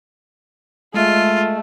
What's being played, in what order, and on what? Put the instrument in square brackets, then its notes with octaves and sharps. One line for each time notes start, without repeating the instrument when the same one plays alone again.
[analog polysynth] G#3 [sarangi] A3 [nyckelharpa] F4